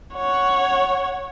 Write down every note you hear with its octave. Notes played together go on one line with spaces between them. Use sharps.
C#5 F#5